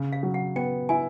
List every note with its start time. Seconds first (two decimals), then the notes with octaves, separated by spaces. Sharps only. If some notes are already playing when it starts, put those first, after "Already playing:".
Already playing: C#3
0.13 F5
0.23 F#3
0.34 F#5
0.56 B3 G5
0.89 E4 G#5